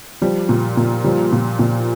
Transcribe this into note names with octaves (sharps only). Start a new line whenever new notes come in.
F3 G3
A#2
A#2
F3 G3
A#2
A#2